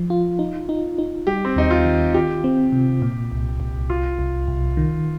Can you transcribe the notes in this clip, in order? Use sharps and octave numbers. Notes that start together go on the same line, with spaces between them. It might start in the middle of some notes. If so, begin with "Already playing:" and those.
Already playing: F3
F4
D#4
D#4
D#4
G3 G4
C4
D#2 D#4
F4
D#3
F4 G4
C4
C3
A#2
C2
C2
C2 F4
C2
C2
D#3